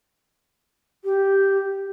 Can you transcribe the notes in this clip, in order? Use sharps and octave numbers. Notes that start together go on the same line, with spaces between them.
G4